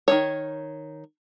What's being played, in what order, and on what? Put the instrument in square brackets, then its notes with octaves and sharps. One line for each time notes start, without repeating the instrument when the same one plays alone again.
[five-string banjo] D#3 E3 C#5